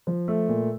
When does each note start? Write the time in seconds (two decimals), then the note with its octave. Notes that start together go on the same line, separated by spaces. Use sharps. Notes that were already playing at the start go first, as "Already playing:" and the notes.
0.07 F3
0.28 A3
0.48 A#2